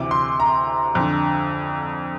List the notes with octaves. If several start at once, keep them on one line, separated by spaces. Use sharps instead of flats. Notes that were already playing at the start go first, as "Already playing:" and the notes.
Already playing: D2 C3 E3 D6
C6
A#5
F2 D3